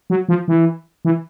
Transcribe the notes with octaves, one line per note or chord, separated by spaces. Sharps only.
F#3
F3
E3
E3